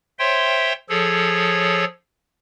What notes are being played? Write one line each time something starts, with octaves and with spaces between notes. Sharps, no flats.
C5 C#5 E5 G5 C6
F3 G#4 A4 C#5